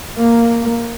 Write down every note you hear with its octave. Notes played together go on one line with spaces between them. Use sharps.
A#3